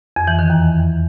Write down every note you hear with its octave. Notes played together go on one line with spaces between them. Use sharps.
F2
E3
D#3
E2